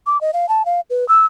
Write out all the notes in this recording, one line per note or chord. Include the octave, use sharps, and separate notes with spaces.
D6
D#5
F5
A5
F5
B4
E6